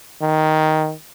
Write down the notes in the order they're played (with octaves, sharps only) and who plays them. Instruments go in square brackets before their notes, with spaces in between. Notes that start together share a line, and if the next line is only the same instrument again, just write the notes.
[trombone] D#3